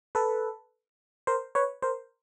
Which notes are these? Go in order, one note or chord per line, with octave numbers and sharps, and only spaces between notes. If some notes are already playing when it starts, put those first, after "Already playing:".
A4 B4
A#4 C5
B4 C#5
A#4 C5